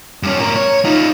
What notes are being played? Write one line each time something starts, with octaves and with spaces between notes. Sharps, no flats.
G2 C#4
A2 A#4
C#5
D#4 F4